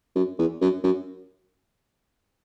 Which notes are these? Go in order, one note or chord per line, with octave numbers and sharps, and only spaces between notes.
F#2
E2
F#2
F#2